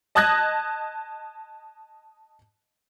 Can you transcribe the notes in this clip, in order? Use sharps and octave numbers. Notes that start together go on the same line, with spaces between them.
D#5 A5 D#6 F#6 G#6 A#6